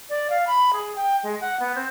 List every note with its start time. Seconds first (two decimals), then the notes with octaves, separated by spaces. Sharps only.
0.10 D5
0.30 F5
0.47 B5
0.73 G#4
0.96 G5
1.23 G#3
1.41 F#5
1.60 B3
1.75 C4